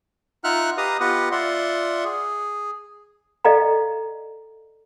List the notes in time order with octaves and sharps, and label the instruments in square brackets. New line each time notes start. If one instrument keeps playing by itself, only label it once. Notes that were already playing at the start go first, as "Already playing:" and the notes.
[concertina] D#4 F4 E5 F#5 F6 F#6
G4 B4 D#5 F5 A#5 D#6
B3 F4 G4 B4 D#5 F#5
F4 D5 E5 F#5 C6
G#4
[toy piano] A4 D5 D#5 F5 G5 A#5